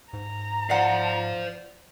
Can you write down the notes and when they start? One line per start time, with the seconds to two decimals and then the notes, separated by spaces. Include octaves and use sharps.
0.13 G#2 A#5
0.70 C5 D5 F5 F#5